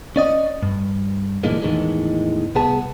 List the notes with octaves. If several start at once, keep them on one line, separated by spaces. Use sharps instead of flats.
C#4 D5 D#5
G2
A#2 D3 E3 G#3 A#3
E2 A2 D#3 E3 G#3
C2 B3 G#4 A5